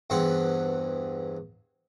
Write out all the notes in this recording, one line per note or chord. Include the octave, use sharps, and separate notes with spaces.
E2 G2 C4 C5 F#5